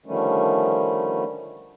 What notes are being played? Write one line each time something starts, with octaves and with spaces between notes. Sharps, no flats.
D3 D#3 F3 G3 A3 C#4